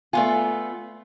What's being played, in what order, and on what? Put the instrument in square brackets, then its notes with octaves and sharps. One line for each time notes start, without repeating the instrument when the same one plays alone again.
[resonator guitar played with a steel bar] A3 B3 F4 [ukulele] D5 G#5